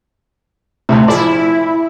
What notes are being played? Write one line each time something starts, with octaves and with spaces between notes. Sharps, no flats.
D2 A2 C3
F3 E4 G#4 D5